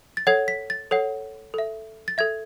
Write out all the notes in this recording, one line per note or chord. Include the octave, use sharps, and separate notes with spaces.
A6
A4 C#5 F#5 G#6
B6
A6
A4 C#5 F#5
A4 E5
A6
A4 E5 G#6